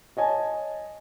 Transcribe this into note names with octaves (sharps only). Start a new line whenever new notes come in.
C#5 D#5 G#5 A5